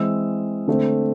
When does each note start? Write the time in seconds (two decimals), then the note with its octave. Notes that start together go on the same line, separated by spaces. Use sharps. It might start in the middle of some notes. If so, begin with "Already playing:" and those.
Already playing: E3 G#3 C4 E6
0.67 D3 A3 C4